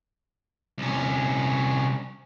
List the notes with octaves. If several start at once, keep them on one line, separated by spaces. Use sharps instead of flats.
C2 C#4